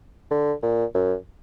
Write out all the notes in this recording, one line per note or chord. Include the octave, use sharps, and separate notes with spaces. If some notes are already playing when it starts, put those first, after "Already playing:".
D3
A#2
F#2